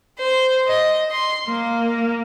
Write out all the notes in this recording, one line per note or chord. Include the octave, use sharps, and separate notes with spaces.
C5
D#5
C6
A#3